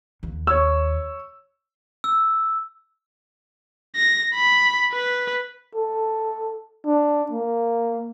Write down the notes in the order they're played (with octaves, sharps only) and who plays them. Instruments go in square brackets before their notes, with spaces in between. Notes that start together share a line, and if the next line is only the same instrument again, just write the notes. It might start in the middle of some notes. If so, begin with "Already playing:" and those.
[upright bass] D#2
[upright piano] C#5 E6
[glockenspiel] E6
[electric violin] A#6
B5
B4
[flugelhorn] A4
D4
A#3